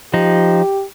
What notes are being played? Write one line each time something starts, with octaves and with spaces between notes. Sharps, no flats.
F3 D#4 G4